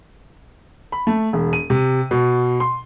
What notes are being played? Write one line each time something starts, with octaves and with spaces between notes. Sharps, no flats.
B5
A3
E1
D#7
C3
B2
C6